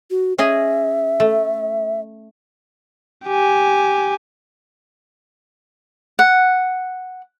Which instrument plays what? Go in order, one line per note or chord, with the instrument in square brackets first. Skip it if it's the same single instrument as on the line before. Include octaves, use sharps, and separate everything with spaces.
[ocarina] F#4
[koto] C#4 G#4 D#5 [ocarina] E5
[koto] A3
[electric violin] G4 G#5
[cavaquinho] F#5